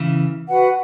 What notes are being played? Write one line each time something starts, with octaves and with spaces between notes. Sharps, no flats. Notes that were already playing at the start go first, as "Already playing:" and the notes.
Already playing: C#3 E3
F#4 B4 F#5